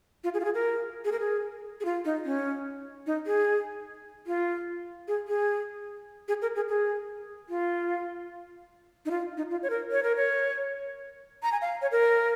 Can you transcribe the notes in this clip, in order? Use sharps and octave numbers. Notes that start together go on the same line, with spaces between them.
F4
G#4
F4
G#4
A#4
G#4
A#4
G#4
G#4
F4
D#4
C#4
D#4
G#4
F4
G#4
G#4
G#4
A#4
G#4
G#4
F4
D#4
F4
D#4
F4
C#5
A#4
C#5
A#4
C#5
A#5
G#5
F5
C#5
A#4